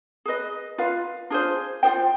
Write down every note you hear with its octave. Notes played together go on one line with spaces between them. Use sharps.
G#4 B4 D#5
F4 B4 F5
D4 F4 G#4 C5
F4 G#4 C5 G5